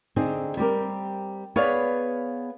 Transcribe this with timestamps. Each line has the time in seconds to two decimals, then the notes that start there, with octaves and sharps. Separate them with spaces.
0.16 D3 C4 D#4 G#4
0.57 G3 C4 G4 A#4
1.56 B3 G#4 B4 C#5 D5 F5